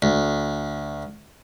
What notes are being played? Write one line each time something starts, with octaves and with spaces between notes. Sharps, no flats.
D2